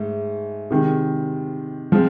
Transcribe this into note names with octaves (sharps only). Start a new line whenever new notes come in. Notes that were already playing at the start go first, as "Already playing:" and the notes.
Already playing: G#2 A3
C3 D#3 G#3
F3 G#3 C4